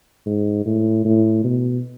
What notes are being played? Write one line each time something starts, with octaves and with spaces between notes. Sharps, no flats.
G#2
A2
A2
B2